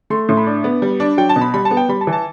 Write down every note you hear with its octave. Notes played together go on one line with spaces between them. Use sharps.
A3 C6
A2 C6
B5
D4
B3
G3
D4
F#3 G5
A5
B2
B5
G3 B5
A5
B3
G5
G3 B5
A5
E3
A5